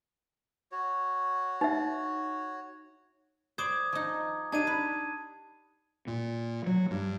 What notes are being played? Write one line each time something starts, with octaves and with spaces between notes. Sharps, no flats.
F#4 C#5
D#4 E5
C5 D5 D6 D#6 G#6
F3 D#4
D4 D#4 G4 A5 G#6 D#7
B4
A#2
F#3
G2